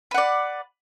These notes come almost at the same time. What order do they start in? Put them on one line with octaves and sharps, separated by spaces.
B4 F#5 D5